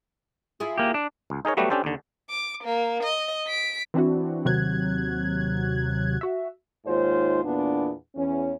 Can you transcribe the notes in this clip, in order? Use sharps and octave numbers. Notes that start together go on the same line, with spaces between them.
E4 F4 G#4
A#3 G4
D4
C#2
D#4 G#4 A#4 C#5
F#3 G3 A3 B3 F#4 G4
C#4 D4 G4 A4 C5
D#2 D3
D6
A#3
D#5
B6 D7
E3 C4 D4 E4 F#4
D#2 C3 F#3 F#6 G#6
F#4 E5
D#2 G#2 F4 C5 C#5
E2 A#2 B3 D4
E2 C#4